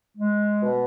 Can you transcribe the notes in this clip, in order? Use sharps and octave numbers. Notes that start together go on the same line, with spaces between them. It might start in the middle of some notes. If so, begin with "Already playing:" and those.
G#3
B2